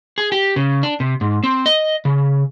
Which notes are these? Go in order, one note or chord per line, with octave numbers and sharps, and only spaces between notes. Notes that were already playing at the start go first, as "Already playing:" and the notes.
G#4
G4
C#3
D4
C3
G#2
C4
D#5
C#3